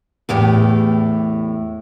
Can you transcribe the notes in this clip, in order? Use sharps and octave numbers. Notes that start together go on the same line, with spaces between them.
E2 A2 G4